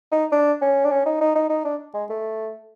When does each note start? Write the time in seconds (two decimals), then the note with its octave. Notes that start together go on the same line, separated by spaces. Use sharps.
0.12 D#4
0.32 D4
0.61 C#4
0.84 D4
0.91 C#4
1.06 D#4
1.21 D#4
1.35 D#4
1.50 D#4
1.65 D4
1.94 G#3
2.10 A3